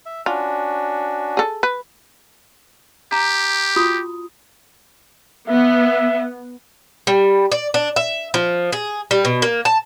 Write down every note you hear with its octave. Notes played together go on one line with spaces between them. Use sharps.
E5
C#4 D4 F4 F#4
G#4 A4
B4
G4 A#5
F4 F#4 D#6
B3 E5
G3
D5
D4
E5
F3
G#4
G3
B2
A#3
A5